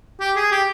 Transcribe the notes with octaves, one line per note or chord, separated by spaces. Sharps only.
G4
G#4
G4